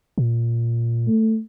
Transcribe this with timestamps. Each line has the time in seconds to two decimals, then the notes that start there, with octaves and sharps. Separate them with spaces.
0.18 A#2
1.07 A3